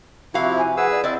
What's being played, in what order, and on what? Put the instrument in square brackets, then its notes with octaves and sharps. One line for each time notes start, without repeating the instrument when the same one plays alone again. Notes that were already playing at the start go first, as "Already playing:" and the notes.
[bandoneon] C3 F3 E4 [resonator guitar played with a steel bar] F#4 F5
[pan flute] G#5
[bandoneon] G#4 B4 E6 [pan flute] F#5
[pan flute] D5
[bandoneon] C4 [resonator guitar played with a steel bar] E4 D5 [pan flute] D#5